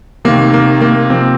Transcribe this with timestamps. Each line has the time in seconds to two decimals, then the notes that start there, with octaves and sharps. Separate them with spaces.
0.25 C3 D#3 A#3
0.54 A#3
0.82 A#3
1.10 C3 F3 C4